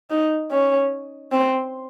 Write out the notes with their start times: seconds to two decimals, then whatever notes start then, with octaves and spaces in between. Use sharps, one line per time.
0.10 D#4
0.51 C#4
1.32 C4